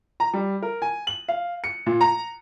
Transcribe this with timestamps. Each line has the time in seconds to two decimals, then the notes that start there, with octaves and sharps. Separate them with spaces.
0.20 A#5
0.33 G3
0.62 A#4
0.82 G#5
1.07 F#7
1.28 F5
1.64 C#7
1.86 A#2
2.01 A#5